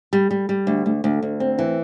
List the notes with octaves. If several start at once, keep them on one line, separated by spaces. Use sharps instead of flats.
G3
G3
G3
D2
D2
D2
D2
C4
E3